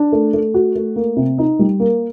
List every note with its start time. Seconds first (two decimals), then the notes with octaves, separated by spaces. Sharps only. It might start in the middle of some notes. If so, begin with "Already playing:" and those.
Already playing: D4
0.12 A3
0.33 A3
0.54 F#4
0.75 A3
0.96 A#3
1.17 C3
1.38 D#4
1.59 G3
1.80 A#3